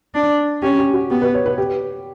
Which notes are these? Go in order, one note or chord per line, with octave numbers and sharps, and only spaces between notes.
D4
C#4 G4
G4
F#4
B3 G4
B4
C#5
B4
G4